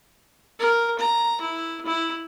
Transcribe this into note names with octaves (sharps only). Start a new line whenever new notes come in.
A#4
A#5
E4
E4